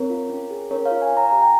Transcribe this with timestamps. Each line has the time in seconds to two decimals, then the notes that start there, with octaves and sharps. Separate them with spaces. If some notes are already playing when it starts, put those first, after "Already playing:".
Already playing: C4 A#4 C#5
0.10 F4
0.30 C#4
0.51 G#4
0.71 C#4 A#4 C#5
0.85 C#5 F5
0.91 F4
1.02 F5 G#5
1.12 C#4 A#5
1.30 G4 G#5
1.42 G5 A#5